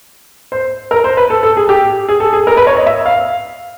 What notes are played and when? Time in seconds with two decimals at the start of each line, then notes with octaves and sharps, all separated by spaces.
0.52 C5
0.91 A#4
1.04 C5
1.17 B4
1.30 A4
1.43 A4
1.57 G#4
1.69 G4
2.09 G#4
2.20 A4
2.33 G#4
2.47 A#4
2.57 B4
2.67 C#5
2.77 D#5
2.86 E5
3.06 F5